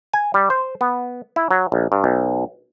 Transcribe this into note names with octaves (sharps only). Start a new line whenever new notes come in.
G#5
G3
C5
B3
E4
F#3
A#1
G2
B1